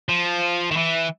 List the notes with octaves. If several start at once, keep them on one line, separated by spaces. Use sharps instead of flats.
F3
D#3
E3